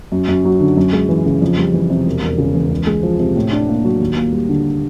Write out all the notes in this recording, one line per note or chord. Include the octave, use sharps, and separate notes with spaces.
F#2
F#2
F#3
D3
F#2
G#3
E3
C#3
F2
G3
E3
C3
E1
E1
C#3
E2
C#2
G#3
F3
C3
A2
D4
A#3
F#3
D#2
A#3
G3
D3